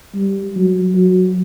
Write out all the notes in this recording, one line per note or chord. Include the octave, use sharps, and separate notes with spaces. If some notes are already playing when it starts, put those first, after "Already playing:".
G3
F#3
F#3